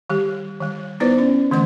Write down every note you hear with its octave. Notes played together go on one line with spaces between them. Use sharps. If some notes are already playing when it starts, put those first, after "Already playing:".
D#3 G3 G4
D#3 G3
B3 D#4 E4 B4 C5 D5
C#4
D3 E3 A3 C6